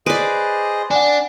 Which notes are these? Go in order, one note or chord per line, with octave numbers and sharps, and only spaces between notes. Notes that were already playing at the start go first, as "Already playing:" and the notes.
G#4 B4 C5 D5 D#5 D7
D4 F#5 G#5